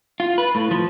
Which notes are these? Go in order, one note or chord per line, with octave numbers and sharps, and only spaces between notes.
F4
B4
A2
F3